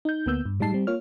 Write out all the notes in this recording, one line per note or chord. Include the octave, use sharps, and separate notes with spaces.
D#4 G6
D2 A#3 B3 E6 G6
G2
A2 G3 G#3 D#4 A5 C7
G3 C4
A#3 F4 C#5 F6